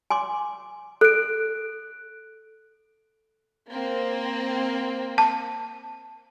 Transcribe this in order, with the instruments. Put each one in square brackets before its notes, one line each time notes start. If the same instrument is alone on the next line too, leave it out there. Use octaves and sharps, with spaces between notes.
[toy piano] G#5 C6 D6
[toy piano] A4 [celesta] F#6 D7
[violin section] A#3 C4
[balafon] A5